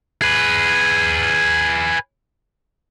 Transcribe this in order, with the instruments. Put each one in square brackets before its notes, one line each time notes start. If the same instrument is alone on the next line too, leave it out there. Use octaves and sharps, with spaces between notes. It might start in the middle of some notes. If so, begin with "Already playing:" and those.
[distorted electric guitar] G#4 B4